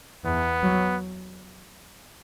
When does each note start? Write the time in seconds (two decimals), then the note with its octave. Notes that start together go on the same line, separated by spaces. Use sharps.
0.25 E2 B3
0.63 F#3